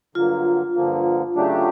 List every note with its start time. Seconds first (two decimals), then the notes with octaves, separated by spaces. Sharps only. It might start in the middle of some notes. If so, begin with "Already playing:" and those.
0.15 G2 D3 F#3 A#3 F4
0.75 G2 D3 F3 A#3
1.35 C#3 F#3 A3 D4 G4